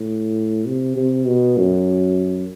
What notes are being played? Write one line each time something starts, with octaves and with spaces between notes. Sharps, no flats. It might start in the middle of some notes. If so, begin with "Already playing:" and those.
Already playing: A2
C3
C3
B2
F#2